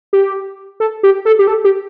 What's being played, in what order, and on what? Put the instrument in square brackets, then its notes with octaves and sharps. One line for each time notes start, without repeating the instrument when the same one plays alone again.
[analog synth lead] G4
A4
G4
A4
G4
A4
G4